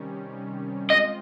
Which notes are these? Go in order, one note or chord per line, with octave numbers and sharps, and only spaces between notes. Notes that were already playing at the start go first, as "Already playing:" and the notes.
Already playing: C3 D#3 G3 C#4
G#3 C4 F4 D#5